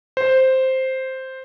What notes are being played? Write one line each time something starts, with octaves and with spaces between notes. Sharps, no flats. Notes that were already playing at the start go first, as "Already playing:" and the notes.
C5